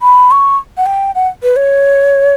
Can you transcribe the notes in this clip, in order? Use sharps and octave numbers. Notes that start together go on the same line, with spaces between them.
B5
C#6
F#5
G5
F#5
B4
C#5